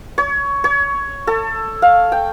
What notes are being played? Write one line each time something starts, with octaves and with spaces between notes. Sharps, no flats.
C#5
C#5
A4
F5
G5